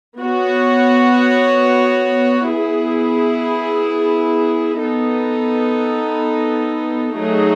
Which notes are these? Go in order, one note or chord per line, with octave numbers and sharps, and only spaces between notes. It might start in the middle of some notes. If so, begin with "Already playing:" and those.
B3 F#4 C#5
B3 E4 G#4
B3 D#4 A4
F#3 A3 D#4 G#4